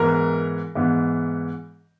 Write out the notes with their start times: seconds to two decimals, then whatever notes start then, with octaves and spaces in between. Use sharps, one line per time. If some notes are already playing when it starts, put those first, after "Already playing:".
Already playing: G#2 E3 B3 A#4
0.75 G#2 E3 B3